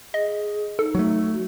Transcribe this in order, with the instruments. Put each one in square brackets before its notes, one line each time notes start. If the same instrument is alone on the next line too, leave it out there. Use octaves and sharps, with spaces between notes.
[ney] G#4 [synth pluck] D#5
[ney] D#4 [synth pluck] A4
[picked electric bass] F#3 A3
[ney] F#4